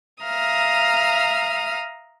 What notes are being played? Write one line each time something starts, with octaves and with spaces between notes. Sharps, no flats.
E5 F5 A#5 D#6 F6